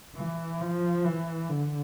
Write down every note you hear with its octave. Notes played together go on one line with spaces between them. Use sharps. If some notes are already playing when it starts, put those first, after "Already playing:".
E3
F3
E3
D3